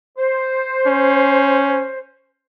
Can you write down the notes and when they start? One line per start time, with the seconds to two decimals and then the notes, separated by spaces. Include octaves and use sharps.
0.18 C5
0.86 C#4